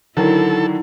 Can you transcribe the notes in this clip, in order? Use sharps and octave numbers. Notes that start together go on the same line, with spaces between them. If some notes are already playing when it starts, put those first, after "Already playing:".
D3 D#3 F#3 E4 A4